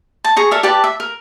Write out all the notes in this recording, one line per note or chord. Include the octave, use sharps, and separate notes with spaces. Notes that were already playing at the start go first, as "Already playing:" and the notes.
A5
G#4 A#5 C#6
A4 A#4 D5 E5
G4 B4 D5 A5
E5
A#4